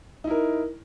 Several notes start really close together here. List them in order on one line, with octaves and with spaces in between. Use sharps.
D#4 E4 A#4